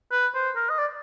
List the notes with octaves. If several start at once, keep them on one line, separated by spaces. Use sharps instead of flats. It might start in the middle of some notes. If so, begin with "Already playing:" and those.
B4
C5
A#4
D#5
D5